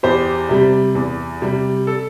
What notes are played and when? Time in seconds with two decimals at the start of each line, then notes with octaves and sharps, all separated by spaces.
0.03 E2 G4 C5
0.49 C3 G3
0.95 E2
1.42 C3 G3
1.87 A4